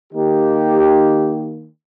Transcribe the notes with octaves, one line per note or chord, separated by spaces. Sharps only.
D#3 A#3 D#4 G4